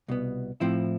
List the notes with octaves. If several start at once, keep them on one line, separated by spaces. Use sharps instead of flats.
C2 B2 B3
A2 F3 C4 E4